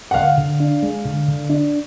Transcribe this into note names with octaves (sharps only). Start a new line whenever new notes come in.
F#5
D3 F5
D3
D4
G#3
D3
D3
D4